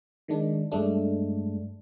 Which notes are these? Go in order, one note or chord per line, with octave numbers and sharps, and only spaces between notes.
D#3 G#3 D4
G2 G#3 A3 D4